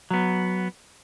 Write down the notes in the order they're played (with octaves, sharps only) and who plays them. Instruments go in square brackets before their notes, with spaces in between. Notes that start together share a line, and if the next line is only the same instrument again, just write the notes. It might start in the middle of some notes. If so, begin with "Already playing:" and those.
[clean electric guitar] F#3 B3